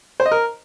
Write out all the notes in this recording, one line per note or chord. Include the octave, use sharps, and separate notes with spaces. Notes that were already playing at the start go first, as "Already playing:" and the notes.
C5
D#5
A#4